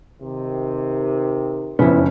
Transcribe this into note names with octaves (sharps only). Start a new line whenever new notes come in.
C3 D#3
F#1 F2 B3 C#4 E4